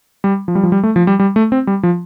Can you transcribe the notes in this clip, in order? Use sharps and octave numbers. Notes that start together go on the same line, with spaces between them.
G3
F3
G3
F3
G3
A3
F3
G3
G3
A3
C4
G3
F3